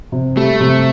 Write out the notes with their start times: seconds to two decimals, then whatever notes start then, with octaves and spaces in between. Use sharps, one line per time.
0.12 C3
0.36 G3 A3
0.60 C3